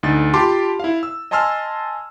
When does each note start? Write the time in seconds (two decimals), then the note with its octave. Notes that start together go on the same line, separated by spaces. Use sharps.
0.03 D2 D#4 A6
0.34 F4 G4 A5 B5 C6 D6
0.80 E4 F5
1.03 E6
1.31 D#5 G#5 A5 C6 E6 F6